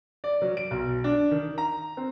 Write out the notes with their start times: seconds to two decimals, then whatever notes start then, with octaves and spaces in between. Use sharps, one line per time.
0.24 D5
0.42 F#3
0.57 D7
0.71 B1
1.04 D4
1.31 D#3
1.58 A#5
1.97 C4